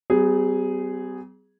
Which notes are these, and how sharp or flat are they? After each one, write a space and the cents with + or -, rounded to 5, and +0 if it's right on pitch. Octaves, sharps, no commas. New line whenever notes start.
G3 -40 B3 +45 G#4 -5